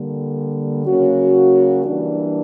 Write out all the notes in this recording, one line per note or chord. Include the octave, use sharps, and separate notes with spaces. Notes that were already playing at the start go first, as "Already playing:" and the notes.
Already playing: D3 G3 A#3
C#3 F#3 A#3 C#4 F#4
E3 G3 A#3 D4